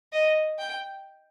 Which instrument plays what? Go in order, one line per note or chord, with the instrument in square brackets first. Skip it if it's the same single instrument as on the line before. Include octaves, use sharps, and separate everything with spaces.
[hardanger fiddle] D#5
G5